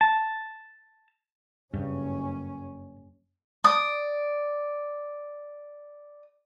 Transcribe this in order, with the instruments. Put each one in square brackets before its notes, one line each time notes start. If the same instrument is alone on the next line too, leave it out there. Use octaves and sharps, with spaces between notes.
[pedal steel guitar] A5
[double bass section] F#1 C#4 [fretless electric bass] G2 C#3
[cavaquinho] D5 D#6